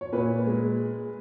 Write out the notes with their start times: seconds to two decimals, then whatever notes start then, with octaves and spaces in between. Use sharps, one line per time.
0.01 C#5
0.12 A#2 B4
0.46 G#3